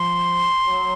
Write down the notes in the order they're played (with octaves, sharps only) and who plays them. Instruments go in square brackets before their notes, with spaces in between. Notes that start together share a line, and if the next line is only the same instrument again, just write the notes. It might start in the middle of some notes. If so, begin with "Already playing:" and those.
Already playing: [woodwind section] F3 [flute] C6
[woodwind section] F#3